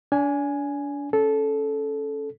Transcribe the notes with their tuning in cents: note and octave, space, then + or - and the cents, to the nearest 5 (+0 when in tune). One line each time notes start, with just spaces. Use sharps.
D4 -35 G#5 +0
C#4 +0 A4 -15